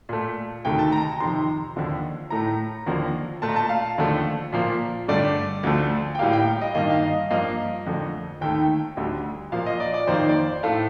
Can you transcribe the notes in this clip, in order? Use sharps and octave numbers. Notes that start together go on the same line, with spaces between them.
A#2 A3
D2 C3 D#3 A3 G5
A5
A#5
A#5
F2 C3 D#3 C6
D#2 D3 F3
A2 A3 A#5
D#2 D3 F3 A#3
A#2 A3 A5
A#5
A5
F5
D#2 D3 F3 A3
A#2 F3 A#3
G2 D3 A3 D5
D2 D3 F3 A3
G5
A2 G3 A#3 F5
G5
F5
D#5
G2 D#3 A#3 D#5
F5
D#5
G2 F3 A#3 D#5
F2 D3 A3
D#2 D#3 A3 G5
D2 D3 G3
A#2 F3 A#3 F5
D#5
D5
D5
F2 D#3 A#3 C5
D5
C5
A2 A3 F5